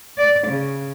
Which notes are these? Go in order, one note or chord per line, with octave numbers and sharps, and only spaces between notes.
D5
C#3